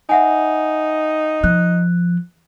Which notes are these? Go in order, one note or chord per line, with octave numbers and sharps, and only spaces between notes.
D#4 E5 F#5 G#5
F3 F#6